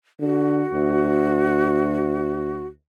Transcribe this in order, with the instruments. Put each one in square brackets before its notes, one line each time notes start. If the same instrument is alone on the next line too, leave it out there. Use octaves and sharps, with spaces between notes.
[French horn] D3 [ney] F#4
[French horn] D2